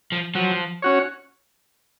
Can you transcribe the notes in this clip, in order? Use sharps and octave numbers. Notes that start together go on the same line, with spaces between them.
F3
F3 F#3
C#4 F#4 C#5